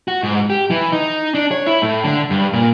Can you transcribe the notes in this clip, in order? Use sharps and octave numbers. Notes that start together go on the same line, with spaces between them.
F#4
G#2
G4
E3
D#4
D4
C#5
E4
A2
D3
G2
A#2